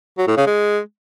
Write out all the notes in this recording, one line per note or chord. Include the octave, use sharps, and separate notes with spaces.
F#3
A2
C#3
G#3